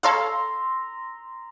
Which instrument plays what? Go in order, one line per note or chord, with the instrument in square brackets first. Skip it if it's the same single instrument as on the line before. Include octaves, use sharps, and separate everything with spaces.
[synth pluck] A4 C#5 F5 [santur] A#5 C6 E6